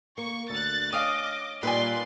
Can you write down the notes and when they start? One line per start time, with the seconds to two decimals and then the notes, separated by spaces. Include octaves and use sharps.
0.18 A#3 C#6
0.50 D2 F#6 A6
0.93 C#4 D#5 F5 D6 D#6
1.63 A#2 G3 D#4 B4 D5 F5 G#5 C6